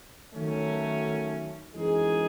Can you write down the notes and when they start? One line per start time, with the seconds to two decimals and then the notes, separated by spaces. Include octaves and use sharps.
0.33 D#3 F#3 A3 C#4
1.73 F#2 E3 G#3 D#4 G#4